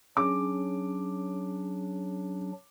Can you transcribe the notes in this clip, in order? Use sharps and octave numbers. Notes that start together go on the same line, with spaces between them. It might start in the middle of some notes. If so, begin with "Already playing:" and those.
F#3 C#4 D4 G#4 D6